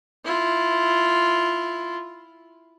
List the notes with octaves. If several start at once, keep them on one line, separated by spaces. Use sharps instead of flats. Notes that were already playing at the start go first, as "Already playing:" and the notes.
E4 F4